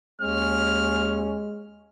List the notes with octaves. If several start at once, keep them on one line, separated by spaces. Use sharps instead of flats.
D#2 G#3 C#4 F6